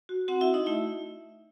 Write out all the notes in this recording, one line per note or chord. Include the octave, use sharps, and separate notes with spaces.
F#4
C4 F#4 F#5
E4 E5
F#4
D#4 D#5
A3 E4 E5